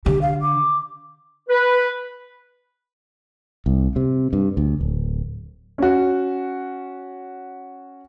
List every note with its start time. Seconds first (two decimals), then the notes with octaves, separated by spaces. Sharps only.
0.06 D3 G4
0.22 F5
0.42 D6
1.49 B4
3.66 C2
3.96 C3
4.33 G2
4.57 D2
4.81 D1
5.78 C#4 F#4